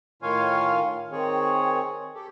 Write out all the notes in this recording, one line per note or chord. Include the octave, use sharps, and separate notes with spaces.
A2 D#3 F4 C#5 F5 G#5
D#3 C4 G#4 C#5
G4 A4